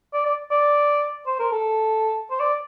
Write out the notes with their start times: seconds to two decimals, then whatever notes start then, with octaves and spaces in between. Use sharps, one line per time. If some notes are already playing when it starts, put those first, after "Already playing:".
0.13 D5
0.25 D5
0.51 D5
1.27 C5
1.40 A#4
1.52 A4
2.30 C5
2.40 D5